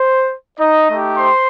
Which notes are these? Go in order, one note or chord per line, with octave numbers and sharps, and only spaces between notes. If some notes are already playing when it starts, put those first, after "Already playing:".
Already playing: C5
D#4 D#5
A3 D#4 G4
C5 C6